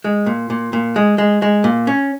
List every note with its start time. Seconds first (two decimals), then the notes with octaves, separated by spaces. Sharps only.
0.04 G#3
0.26 A#2
0.50 A#2
0.73 A#2
0.96 G#3
1.18 G#3
1.42 G#3
1.64 A#2
1.87 C#4